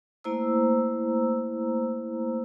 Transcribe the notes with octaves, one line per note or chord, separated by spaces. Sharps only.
A3 A#3 E4 C5 A#5 E6